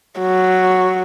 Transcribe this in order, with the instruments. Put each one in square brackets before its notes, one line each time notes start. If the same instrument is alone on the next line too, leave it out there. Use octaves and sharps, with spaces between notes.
[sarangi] F#3